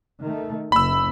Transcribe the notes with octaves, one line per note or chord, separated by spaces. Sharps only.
D#3 A3
F#1 B5 E6